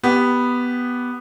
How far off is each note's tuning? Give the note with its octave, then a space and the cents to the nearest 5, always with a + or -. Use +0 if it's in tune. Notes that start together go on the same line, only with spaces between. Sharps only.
B3 +0 G4 +0